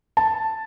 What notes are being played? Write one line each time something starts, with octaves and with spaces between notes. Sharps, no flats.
A5